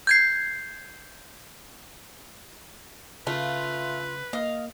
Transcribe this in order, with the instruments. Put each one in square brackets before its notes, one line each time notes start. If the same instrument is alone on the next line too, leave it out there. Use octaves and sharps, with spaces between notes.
[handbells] G6 G#6 C7
[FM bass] C#3 [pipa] A3 [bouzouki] F4 [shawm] B4
[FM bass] A#3 [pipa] D#5 [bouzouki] F5